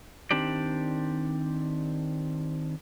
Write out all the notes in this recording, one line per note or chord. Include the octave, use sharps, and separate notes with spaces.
D#3 C4 D4 G4 D5